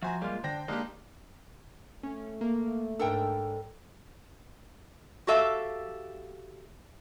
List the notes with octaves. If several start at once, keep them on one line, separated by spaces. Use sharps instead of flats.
F3 F#4 C5 E5 G#5 A#5
G3 G#3 A#3 F4 F5
D3 D4 C5 G5 A#6
G#3 A#3 D4 D#4 G4 D#5 F5
A3 C#4
A#3
G#2 D4 A4 A#4 G5
F#4 G4 A4 E5 F5